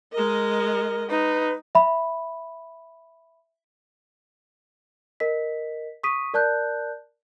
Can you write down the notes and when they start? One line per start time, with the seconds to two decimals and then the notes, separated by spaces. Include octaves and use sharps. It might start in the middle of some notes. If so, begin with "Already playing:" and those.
0.13 G#3 A#4 D#5
1.09 D#4 B4
1.75 E5 B5
5.20 A#4 D#5 B6
6.03 C#6 D#6 B6 D#7
6.34 A#4 D5 A5 F#6 G6